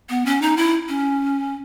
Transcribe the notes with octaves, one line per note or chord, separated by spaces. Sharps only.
B3
C#4
D#4
E4
C#4